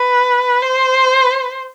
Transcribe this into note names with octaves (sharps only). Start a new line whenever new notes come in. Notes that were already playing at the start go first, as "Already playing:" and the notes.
Already playing: B4
C5